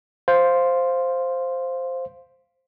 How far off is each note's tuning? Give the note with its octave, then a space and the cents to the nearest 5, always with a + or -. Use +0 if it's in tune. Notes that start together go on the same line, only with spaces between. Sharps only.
C5 +0 F5 +0